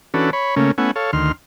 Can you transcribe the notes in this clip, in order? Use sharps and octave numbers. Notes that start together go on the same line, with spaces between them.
E3 C#4 D4 F#4 A4 B4
C#5 B5
C#3 A3 A#3 C#4
A3 B3 C#4 E4 F#5 G#5
A4 C#5 F5
D2 D#3 C6 F6